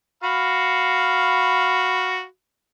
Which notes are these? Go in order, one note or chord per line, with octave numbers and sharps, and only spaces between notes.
F#4 F5 B5